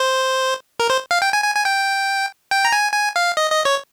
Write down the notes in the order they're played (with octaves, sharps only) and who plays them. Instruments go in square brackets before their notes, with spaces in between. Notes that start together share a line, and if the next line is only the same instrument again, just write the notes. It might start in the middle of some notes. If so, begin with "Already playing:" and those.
Already playing: [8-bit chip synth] C5
A#4
C5
F5
G5
G#5
G#5
G#5
G5
G5
A#5
G#5
G#5
F5
D#5
D#5
C#5